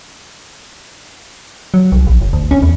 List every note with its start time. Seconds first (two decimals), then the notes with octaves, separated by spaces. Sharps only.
1.74 F#3
1.92 C2
2.07 A#1
2.21 F#1
2.33 D2
2.51 C#4
2.62 E2